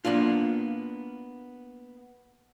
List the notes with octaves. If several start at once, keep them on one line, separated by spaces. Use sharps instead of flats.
A#3 B3 D4 F4